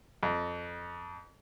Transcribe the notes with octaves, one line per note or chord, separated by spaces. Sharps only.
F2